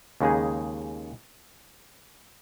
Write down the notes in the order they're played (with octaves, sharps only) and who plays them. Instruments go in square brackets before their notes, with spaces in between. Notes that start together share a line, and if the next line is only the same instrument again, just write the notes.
[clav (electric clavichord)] D#2 C#3 G#3 D#4 G#4